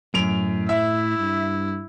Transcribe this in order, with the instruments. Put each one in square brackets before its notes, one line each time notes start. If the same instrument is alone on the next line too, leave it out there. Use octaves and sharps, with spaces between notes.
[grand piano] F#2 D7 F7 [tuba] A2
[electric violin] E4 [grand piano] E5
[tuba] G2